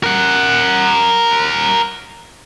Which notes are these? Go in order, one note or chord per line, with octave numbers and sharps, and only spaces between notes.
A#4 F#5